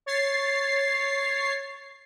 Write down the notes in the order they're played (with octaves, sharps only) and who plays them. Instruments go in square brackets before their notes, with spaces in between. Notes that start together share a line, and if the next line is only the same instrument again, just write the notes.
[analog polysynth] C#5 A6 C7